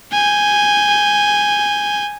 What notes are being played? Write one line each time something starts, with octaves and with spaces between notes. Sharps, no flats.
G#5 G6